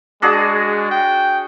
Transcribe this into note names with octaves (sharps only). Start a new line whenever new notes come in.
G#3 D4 F#4 G#4
G5